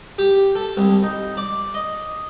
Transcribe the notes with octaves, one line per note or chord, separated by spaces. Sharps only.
G4
A4
C2
D#4
D5
D#5